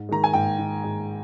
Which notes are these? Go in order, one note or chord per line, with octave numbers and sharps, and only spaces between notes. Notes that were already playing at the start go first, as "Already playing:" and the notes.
Already playing: G#2
D#3 G#3 A#5
G#5
G#2 G5
D#3 G#3
G#2